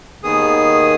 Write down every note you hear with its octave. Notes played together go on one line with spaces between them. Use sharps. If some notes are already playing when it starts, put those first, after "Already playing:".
D#2 D#3 B3 G#4 D#6